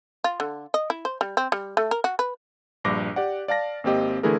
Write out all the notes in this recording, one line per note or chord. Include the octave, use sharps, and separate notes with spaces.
F4
D3
D#5
E4
C5
G3
C4
G3
A3
A#4
F#4
B4
A#1 G2 D6 A#6
G4 D5 F#5
D5 F5 A5 A#6
G#1 A#3 C4 G4 D#5
D3 E3 A3 E4 G#4 A#4